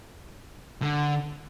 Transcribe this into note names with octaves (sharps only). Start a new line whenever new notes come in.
D3